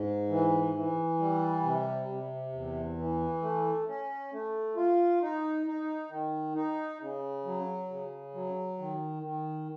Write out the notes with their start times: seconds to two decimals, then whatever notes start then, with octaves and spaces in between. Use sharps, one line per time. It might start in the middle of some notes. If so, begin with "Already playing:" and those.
Already playing: G#2
0.29 E3
0.74 E3
1.19 G3
1.63 C3
2.09 C3
2.52 E2
2.98 E3
3.42 A3
3.88 C#4
4.32 A3
4.76 F4
5.22 D#4
5.67 D#4
6.10 D#3
6.55 D#4
7.01 C#3
7.45 F#3
7.90 C#3
8.34 F#3
8.78 D#3
9.23 D#3